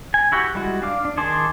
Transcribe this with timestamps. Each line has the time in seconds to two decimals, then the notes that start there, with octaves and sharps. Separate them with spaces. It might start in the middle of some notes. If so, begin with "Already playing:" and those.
0.14 G#5
0.32 E4 F#4 G4 G5
0.55 G3 G#3 E4 F#4
0.82 D4 F5 D6
1.05 D4
1.17 D#3 G#4 A5 C6 D6